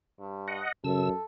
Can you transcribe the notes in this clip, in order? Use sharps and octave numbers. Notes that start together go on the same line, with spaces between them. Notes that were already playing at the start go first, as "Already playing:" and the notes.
G2
D#5 F#5
F#2 C#3 A4 E6